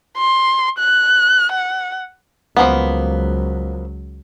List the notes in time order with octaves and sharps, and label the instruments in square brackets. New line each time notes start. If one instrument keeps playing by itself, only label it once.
[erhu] C6
F#6
F#5
[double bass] C#2 F#3 [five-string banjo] F3 A#3 B3